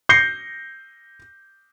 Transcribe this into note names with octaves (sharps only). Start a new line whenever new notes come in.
G6 A#6 C7 C#7 G7